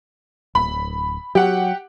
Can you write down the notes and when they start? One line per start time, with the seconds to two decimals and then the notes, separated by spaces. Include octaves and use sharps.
0.55 D1 B5
1.35 F#3 G4 F#5